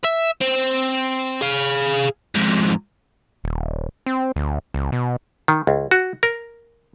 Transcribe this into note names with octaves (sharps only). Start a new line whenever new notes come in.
E5
C4
G#4 F5
F2 G#2
D#1
C4
D2
C#2
B2
D#3
C#2
F#4
A#4